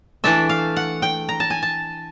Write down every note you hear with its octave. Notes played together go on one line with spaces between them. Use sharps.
E3 A3 D4 E5
F5
F#5
G5
A#5
A5
G#5
A5